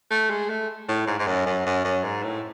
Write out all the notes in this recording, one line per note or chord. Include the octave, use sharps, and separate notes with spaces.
A3
G#3
A3
A2
G#2
G#2
F#2
F#2
F#2
F#2
G#2
A2